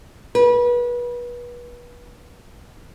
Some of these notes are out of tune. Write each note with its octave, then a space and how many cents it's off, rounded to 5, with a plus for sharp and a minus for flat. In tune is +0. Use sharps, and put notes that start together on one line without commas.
B4 -30